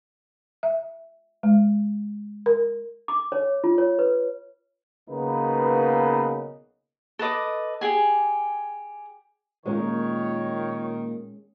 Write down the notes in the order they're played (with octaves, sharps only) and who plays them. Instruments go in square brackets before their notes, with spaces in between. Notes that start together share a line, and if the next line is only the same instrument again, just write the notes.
[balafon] E5
G#3
A#4
[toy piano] D6
C#5
F4
C#5
B4
[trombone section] B1 C#3 A#3 B3 D#4 B4
[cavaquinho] A4 B4 D#5 D6
G4 G#4 G#5
[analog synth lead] A#2 [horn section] D#3 [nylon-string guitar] G#3 C#4 [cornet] C#5